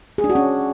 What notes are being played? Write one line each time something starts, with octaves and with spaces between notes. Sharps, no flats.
G#4
D4
F#4
C#4